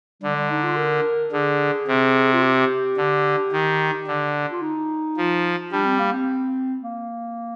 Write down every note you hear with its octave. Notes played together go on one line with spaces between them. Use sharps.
D3 G3
G3
D#4
F4
A#4
D3 G#4
C3
F4
G4
D3
D#3
D3
F4
D#4
F3
G3 D4
C4
A#3
C4
A#3